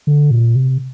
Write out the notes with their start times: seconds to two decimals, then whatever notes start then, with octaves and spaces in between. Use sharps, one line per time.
0.07 D3
0.31 A#2
0.55 C3